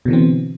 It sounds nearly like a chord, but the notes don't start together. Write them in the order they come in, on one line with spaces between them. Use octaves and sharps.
B2 D3 E3 C4